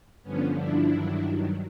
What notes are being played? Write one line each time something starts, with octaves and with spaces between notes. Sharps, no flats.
G2 D3 F3 B3 C#4
D4 E4
G2 D#3 F#3